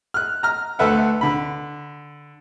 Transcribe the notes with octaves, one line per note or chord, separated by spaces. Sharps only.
F6 F#6
A#5 F6
D2 A4 B4 E5 F#5
D3 B5